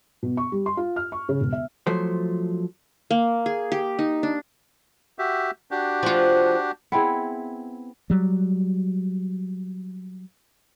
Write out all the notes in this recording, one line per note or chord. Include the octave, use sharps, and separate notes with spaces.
B2
C#6
G3
C6
F4
F6
C#6
C#3
E1
E5
F3 F#3 A3 C5
A#3
G#4
G4
D#4
D4
F#4 G4 E5
D4 F#4 G4
F3 F4
B3 C4 E4 G#4
F#3 G3